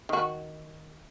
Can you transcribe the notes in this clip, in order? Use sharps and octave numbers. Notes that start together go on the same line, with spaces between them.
D#3 F#4